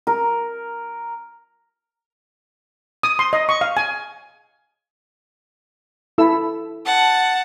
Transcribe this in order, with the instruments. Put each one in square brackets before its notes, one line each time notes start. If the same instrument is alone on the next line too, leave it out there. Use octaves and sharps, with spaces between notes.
[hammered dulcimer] A#4
[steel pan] D#6
C6
D#5
C#6
F5
G#5
E4 A4 E6
[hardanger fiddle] F#5 A5